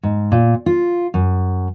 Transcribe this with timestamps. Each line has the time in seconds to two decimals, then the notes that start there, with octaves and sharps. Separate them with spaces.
0.03 G#2
0.32 A#2
0.66 F4
1.14 F#2